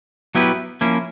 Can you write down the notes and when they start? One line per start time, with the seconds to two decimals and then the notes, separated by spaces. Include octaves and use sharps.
0.35 F#3 B3 E4 G4 B4
0.81 F3 A#3 C#4 E4